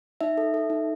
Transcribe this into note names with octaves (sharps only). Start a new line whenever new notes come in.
D#4 E5
A4
A4
D#4